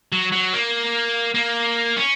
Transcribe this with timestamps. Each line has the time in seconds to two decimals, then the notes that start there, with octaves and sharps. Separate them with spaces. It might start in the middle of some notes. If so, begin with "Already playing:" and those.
0.12 F#3
0.32 F#3
0.53 A#3
1.34 A#3
1.97 C#4